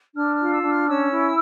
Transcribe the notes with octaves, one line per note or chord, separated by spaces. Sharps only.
D4 F6
F6
F4
E6
D4
F6
C#4 E6
E4